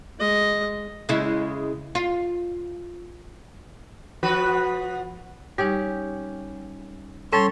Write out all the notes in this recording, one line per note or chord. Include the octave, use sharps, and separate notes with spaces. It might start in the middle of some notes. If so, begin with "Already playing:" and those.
G#3 D#5
C#3 G#3 E4
F4
F3 F#4 B4
G3 C#4 D#4 G4
G3 C#4 A4 C#5 A5 C6 A6